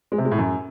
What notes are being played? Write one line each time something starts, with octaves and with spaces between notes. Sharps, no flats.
G#3
C3
G#3
A2
F#2